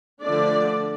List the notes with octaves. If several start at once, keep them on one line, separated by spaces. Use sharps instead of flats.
D3 F3 A3 D4 D5